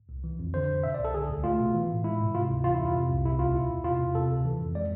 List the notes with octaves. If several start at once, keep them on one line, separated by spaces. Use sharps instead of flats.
C2
E3
F2
D3 C5
F2
B2 E5
D5
C2
A4
D3 G#4
D2
A3 F4
B2
E3
A2
G#3 E4
G#2
C3 F4
D2
E3 F4
E4
F2
F4
C3
C2
C3 E4
D2 F4
B2 E4
E2
C3 F4
E2
C3 A4
D2
E3
F2
G#3 D5